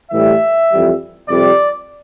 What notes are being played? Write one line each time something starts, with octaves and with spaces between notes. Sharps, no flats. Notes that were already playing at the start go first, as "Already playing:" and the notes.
A2 E3 G3 E5
F2 E3 G3
F2 C3 G3 D5